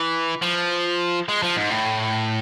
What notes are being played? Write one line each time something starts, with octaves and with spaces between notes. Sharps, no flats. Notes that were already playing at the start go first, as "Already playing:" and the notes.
Already playing: E3
F3
G#3
F3
G#2
A2